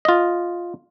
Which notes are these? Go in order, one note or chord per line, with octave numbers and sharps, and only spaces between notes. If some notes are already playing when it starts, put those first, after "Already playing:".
F4 D#5